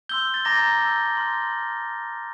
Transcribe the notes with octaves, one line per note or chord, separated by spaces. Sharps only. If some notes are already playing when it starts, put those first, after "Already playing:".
C6 E6 G6 G7
A6
A#5 D6 G6 A#6
A5 E6 G6
C6 F6